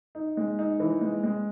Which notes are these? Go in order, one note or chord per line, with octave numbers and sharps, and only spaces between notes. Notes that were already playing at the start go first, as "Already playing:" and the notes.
D#4
G#3
D#4
E3
G#3
G#3